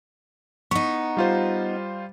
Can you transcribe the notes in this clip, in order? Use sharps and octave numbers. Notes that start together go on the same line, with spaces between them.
B3 D#4 C#6
G3 F4 C5